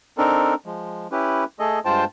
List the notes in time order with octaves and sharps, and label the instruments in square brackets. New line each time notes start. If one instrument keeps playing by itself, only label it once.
[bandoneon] C4 D4 D#4 A4 A#4
F3 G#3
C#4 E4 G4 B4
A3 G#4 A4 D#5
G2 G#3 F4 C5 G5 A5